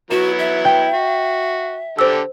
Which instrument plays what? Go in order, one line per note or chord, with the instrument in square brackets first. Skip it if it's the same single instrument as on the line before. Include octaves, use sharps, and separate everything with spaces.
[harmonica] F#3 B3 E4 [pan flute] F#4 [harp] E7
[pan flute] E5
[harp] G5
[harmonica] F#4
[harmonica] D3 G4 A4 [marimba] C5 E6